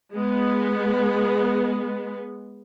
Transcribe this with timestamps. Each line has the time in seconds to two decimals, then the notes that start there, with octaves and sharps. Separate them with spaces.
0.14 G#3 B3